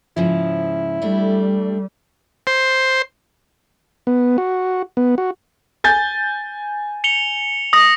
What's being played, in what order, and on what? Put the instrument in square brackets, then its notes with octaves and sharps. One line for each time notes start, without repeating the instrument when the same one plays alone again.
[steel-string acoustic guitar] G#2 C#3 F3 [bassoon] E4
[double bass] G3 [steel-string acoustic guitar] A3 D4
[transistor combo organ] C5
B3
F#4
B3
F#4
[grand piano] G#5 G6 A6
[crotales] C#7 F7 G7
D#6 A#6